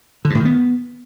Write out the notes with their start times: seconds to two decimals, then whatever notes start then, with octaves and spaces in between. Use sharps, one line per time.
0.25 D3
0.30 G2
0.35 A2
0.40 D#3
0.45 B3